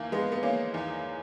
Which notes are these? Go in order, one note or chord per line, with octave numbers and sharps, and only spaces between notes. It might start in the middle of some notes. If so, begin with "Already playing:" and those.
Already playing: E2 D#3 A#3
G#3 B3
B3
A#3 C#4
E2 D#3